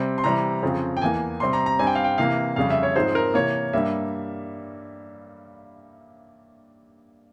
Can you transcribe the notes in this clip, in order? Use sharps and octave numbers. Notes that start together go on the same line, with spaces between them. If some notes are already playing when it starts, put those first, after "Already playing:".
Already playing: C3 G3 C4
C6
C3 E3 G3 C4 A#5
F2 C#3 F3 C4
G5
E2 E3 A#3 G#5
C3 G3 C4 C6
A#5
A#5
G2 G3 C4 G#5
G5
F5
G5
C3 E3 A#3 F5
F2 C#3 G3 F5
E5
C#5
G#2 F3 G#3 C4 C5
A#4
C3 E3 A#3 C#5
G2 G3 A#3 E5